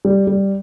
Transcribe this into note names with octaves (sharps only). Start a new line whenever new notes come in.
G3
G3